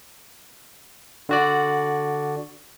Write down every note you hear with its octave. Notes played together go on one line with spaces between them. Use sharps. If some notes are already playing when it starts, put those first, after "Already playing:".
D3 F#4 D5